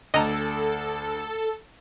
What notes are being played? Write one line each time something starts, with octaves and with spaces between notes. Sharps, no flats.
D2 A4 D#5 A#5